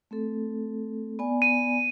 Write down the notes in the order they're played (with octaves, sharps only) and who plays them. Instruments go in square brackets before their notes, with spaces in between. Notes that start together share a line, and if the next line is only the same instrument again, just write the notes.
[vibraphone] A3 C4 A4
B3 D5 G#5
[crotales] D#7